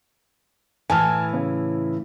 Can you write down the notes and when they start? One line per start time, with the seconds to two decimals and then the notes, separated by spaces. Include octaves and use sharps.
0.90 A2 E3 G#5 A5 F6
1.33 C#3